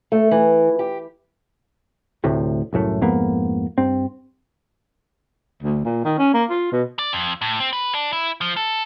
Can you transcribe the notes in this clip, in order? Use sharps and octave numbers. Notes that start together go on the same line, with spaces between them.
A3
E3
G4
D2 A2 C3
C2 F#2 A2 A3
F2 G#2 A#3 B3
G2 C4
D2
A#2
D#3
C#4
A#3
F4
B2
D5
F2
A2
C4
B4
D4
E4
F3
A4